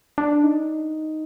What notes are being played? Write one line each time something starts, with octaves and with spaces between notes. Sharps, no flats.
D4
D#4